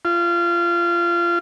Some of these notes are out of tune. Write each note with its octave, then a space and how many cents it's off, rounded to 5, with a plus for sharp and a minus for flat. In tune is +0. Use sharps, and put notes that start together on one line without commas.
F4 -25